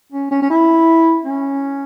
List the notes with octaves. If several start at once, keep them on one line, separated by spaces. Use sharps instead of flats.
C#4
C#4
C#4
E4
C#4